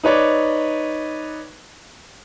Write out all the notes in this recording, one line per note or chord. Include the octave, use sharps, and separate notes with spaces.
D#4 B4 C#5 D5